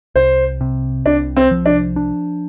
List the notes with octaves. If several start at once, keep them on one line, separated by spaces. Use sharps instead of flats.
C2 C5
C3
C2 D4
C4
F3
D4
D4